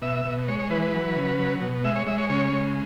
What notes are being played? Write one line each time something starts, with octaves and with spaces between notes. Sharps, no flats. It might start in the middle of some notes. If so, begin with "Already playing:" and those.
B2 E5
B2
G#3 C#5
C#5
E3 B4
B4
F#3
C#3
F#3
B2
G#3 E5
C#5
G#3 E5
C#5
C#3 C#5
G#3